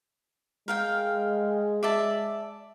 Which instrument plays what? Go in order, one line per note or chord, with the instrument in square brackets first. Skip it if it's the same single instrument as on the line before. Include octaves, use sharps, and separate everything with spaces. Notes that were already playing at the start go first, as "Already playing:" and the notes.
[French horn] G#3 [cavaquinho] A#4 F5 G5
[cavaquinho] D5 E5 A5